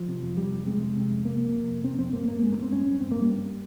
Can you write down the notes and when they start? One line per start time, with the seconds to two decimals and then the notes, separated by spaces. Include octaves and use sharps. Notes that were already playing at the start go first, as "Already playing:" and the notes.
Already playing: F3
0.08 C3
0.23 F2
0.37 C3 G3
0.53 F2
0.66 C3 G#3
0.82 F2
0.96 C3
1.11 F2
1.25 C3 A#3
1.40 F2
1.54 C3
1.70 F2
1.83 C3 C4
1.99 F2 C4
2.13 G2 A#3
2.28 G2 A#3
2.42 G2 G#3
2.52 A#3
2.57 G2
2.62 C4
2.72 G2 C#4
2.86 G2
3.01 G2 C4
3.11 G2 A#3
3.21 G3
3.31 G2